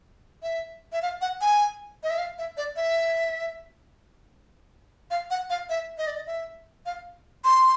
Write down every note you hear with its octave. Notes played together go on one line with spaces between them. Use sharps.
E5
E5
F5
F#5
G#5
D#5
E5
F5
E5
D5
E5
F5
F#5
F5
E5
D#5
D5
D#5
E5
F5
C6